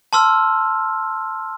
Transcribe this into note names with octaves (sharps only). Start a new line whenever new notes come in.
A5 C6 E6 F6